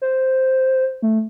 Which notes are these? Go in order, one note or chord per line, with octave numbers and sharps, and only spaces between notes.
C5
A3